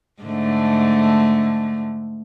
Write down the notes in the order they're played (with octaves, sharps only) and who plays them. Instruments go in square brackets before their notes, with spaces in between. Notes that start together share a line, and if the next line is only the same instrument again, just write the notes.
[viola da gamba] G#2 D3 A3